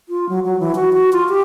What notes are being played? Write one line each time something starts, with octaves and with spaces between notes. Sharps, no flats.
F4
F#3
F#3
E3
F#4
F#4
F4
G4